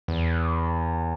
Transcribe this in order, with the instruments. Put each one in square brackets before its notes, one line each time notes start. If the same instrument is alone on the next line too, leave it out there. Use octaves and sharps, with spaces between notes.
[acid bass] E2